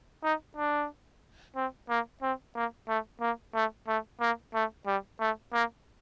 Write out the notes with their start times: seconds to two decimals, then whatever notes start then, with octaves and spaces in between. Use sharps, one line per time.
0.23 D#4
0.57 D4
1.56 C4
1.89 A#3
2.22 C4
2.55 A#3
2.88 A3
3.21 A#3
3.54 A3
3.87 A3
4.20 A#3
4.54 A3
4.87 G3
5.20 A3
5.53 A#3